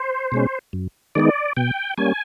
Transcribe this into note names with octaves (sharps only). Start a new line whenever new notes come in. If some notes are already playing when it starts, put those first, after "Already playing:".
Already playing: C5
B2 G#3 C#4
F#2
D#3 G#3 B3 D#4 D5
B2 G5
G3 A#3 C#4 G#5